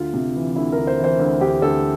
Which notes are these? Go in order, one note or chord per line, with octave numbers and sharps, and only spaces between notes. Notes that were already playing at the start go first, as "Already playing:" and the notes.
Already playing: D2 F4
C3
E3
D2 E4
A#4
D2
C5
E3
C5
D2
D2 G4
D2 A4